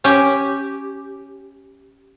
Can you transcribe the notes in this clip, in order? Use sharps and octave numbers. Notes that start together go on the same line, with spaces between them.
C#4 G4